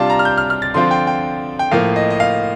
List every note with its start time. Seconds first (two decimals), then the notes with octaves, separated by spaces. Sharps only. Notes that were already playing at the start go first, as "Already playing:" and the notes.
Already playing: C3 G3 D4 F4 F5 A5
0.10 A#5
0.19 F6
0.25 G6
0.37 F6
0.50 F6
0.62 A6
0.74 D3 F3 C4 F4 C6
0.91 G5
1.07 G5
1.59 G5
1.71 A2 F3 A#3 F5
1.96 D#5
2.10 D#5
2.20 F5